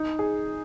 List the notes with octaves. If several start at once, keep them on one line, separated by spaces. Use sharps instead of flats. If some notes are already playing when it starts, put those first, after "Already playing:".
Already playing: D#4
G#4